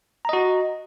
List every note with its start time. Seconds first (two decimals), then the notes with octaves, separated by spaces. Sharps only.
0.25 A#5
0.29 D#5
0.33 F#4